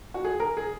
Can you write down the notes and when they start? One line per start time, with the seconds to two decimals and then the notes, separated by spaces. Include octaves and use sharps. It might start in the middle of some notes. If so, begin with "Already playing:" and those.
0.14 F#4
0.25 G#4
0.40 A#4
0.57 G#4